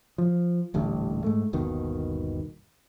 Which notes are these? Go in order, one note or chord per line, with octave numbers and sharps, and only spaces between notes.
F3
D#1 A1 D3 G3
G#2 A3
G1 D#2 B2 D#3